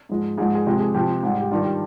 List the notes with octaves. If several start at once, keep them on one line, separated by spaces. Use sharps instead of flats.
G#2 F3 G#3
G#2 F3 G#3 G#4
G#4
C3 F3 G#3 G4
G#4
F2 C3 F3 G4
F4
G#2 G3
G4
G2 D#3 G3 F4
G4